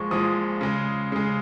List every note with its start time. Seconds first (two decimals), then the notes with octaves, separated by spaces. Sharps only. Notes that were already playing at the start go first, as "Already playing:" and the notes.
Already playing: A#2 F3 G#3 C#6
0.11 A#2 F3 G#3 D#6
0.61 C#3 G#3
1.12 C#3 G#3